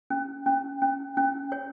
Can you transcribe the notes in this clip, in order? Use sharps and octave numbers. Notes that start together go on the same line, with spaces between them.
C#4
C#4
C#4
C#4
C#5